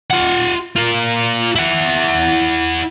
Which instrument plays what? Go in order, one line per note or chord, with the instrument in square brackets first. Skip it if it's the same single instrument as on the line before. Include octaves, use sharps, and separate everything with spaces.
[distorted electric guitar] F4 F#5
F4 A#4
E4 F#5